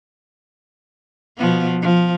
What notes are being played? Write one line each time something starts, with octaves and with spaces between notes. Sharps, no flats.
B2 F3 B3
F3